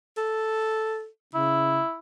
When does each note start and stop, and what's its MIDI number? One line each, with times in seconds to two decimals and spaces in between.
0.17 1.07 69
1.35 1.80 49
1.35 1.98 64